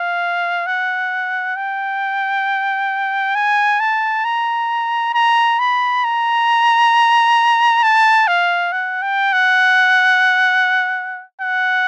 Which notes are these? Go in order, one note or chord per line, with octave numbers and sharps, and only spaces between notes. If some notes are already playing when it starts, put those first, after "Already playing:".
Already playing: F5
F#5
G5
G#5
A5
A#5
A#5
B5
A#5
A5
F5
F#5
G5
F#5
F#5